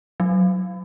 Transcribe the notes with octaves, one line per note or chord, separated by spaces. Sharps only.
F#3